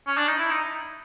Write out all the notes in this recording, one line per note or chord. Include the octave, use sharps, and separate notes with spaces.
C#4
D4
D#4
E4
D#4